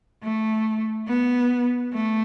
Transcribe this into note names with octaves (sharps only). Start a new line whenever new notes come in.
A3
B3
A3